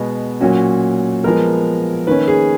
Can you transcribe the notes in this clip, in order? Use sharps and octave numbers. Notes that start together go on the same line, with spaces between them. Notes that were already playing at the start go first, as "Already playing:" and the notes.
Already playing: B2 G#3 B3
A#2 F#3 C#4 F#4
F3 G#3 B3 A#4
D#3 A#3 C#4 B4
G#4